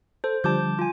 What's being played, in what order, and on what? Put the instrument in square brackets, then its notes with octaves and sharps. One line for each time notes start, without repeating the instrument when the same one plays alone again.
[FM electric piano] A4 [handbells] C5
[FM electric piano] D3 F3 G3 [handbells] A5 D6 G6
[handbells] F4 G#5